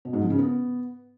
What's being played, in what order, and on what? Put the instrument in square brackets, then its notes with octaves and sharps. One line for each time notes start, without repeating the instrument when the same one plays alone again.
[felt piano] B2
G#2
F3
C#3
B3